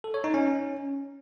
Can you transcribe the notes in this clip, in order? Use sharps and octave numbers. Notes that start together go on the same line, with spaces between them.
A4
C#5
D#4
C#4